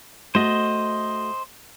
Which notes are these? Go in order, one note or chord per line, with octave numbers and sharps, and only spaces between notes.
A3 F#4 C5 D#5